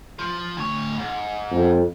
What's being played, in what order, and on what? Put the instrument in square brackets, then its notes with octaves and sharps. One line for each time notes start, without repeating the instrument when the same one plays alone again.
[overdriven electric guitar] F3
D2 C#5
G#2
[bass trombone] F2